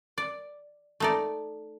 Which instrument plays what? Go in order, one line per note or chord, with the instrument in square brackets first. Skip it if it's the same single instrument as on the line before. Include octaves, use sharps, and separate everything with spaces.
[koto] D5
A3 D#4 D5